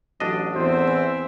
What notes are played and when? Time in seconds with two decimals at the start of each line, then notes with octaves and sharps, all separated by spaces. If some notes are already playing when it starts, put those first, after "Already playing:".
0.20 A1 F#3 D4 D#5
0.55 E2 C4 C5 E5
0.88 E3